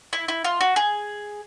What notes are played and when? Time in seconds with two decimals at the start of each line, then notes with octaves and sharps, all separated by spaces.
0.13 E4
0.28 E4
0.44 F4
0.61 F#4
0.76 G#4